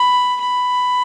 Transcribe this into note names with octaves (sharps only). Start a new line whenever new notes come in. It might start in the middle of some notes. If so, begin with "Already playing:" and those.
Already playing: B5
B5